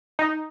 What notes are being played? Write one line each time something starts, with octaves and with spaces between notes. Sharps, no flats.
D#4